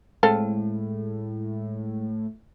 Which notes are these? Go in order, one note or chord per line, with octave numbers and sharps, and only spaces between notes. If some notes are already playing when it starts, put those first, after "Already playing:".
A2 G#3 C4 A4 F5